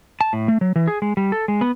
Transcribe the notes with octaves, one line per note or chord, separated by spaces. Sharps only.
A5
A2
A3
F#3
E3
G#4
G#3
G3
A4
G#3
B3